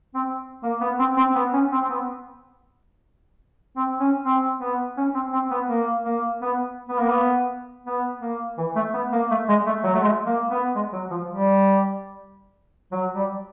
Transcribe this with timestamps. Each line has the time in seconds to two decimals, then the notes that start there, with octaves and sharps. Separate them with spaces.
0.15 C4
0.63 A#3
0.81 B3
0.99 C4
1.17 C4
1.35 B3
1.53 C#4
1.72 C4
1.82 C4
1.90 B3
3.76 C4
4.00 C#4
4.25 C4
4.61 B3
4.97 C#4
5.14 C4
5.33 C4
5.51 B3
5.70 A#3
6.05 A#3
6.42 B3
6.89 B3
6.98 A#3
7.08 B3
7.86 B3
8.22 A#3
8.58 E3
8.76 A3
8.94 B3
9.12 A#3
9.31 A3
9.49 G#3
9.67 A3
9.84 F#3
9.94 A3
10.02 G#3
10.26 A#3
10.51 B3
10.75 G#3
10.93 F#3
11.11 F3
11.29 G3
12.92 F#3
13.15 G3